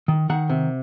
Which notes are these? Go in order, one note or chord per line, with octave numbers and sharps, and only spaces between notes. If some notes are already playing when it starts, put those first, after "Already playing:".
D#3
D#3 F#5
C3